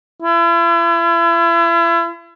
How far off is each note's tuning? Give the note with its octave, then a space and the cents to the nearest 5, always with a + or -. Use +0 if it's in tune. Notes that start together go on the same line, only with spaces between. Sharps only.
E4 +40